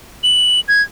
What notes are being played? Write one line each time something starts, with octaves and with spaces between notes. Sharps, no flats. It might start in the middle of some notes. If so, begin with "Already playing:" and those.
F#7
G#6